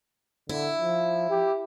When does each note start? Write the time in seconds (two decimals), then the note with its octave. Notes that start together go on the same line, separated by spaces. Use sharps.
0.49 D3 E4
0.80 F3
1.30 G4